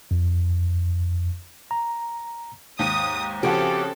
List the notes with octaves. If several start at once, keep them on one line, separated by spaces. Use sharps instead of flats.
F2
A#5
D#2 G#2 D#6
C#3 F3 C4 C#4 F#4 G4 A4